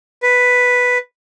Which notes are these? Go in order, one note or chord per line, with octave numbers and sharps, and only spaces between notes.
B4